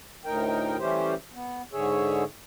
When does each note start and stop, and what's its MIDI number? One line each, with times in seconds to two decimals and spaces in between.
0.25 0.77 38
0.25 0.77 45
0.25 0.77 63
0.25 0.77 70
0.25 0.77 79
0.79 1.14 52
0.79 1.14 55
0.79 1.14 57
0.79 1.14 61
0.79 1.14 67
0.79 1.14 72
1.34 1.62 59
1.73 2.24 44
1.73 2.24 50
1.73 2.24 68
1.73 2.24 73
1.73 2.24 76